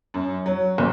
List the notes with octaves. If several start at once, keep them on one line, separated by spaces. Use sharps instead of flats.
F#2
F#3
F#1